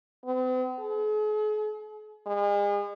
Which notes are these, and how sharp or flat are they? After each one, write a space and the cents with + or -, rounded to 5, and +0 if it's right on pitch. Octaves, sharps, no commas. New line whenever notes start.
C4 -45
G#4 +45
G#3 -40